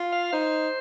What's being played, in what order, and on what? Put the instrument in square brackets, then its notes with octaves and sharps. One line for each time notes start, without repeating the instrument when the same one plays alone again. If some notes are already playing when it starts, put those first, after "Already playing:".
Already playing: [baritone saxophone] F4
[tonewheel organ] F5
[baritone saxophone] D#4 [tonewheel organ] C5